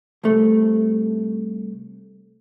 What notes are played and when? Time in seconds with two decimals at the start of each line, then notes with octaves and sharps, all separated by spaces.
0.24 C2 A3